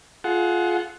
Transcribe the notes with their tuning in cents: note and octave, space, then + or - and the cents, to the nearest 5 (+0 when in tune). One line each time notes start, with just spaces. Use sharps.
F4 +0 G#4 +35 F#5 +0